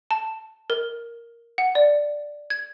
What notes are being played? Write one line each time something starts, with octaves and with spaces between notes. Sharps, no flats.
A5
A#4
F#5
D5
G#6